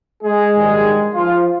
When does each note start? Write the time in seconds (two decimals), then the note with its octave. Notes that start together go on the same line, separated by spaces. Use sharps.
0.23 G#3 G#4
0.53 A#1 G#2 D#3 G3
1.13 F3 F4